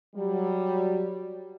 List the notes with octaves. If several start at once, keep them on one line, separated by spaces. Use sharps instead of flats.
F#3 G3